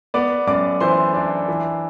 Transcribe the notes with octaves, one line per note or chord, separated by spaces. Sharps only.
B3 D5 D6
F#2 D5 D6
E3 C5 C6
D4
E3